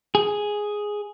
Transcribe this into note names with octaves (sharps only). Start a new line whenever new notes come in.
G#4